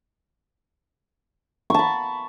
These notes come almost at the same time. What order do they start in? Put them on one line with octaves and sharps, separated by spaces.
C#6 A5 B5